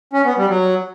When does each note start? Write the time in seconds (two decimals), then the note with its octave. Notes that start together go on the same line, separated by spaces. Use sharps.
0.13 C#4
0.25 B3
0.38 G3
0.49 F#3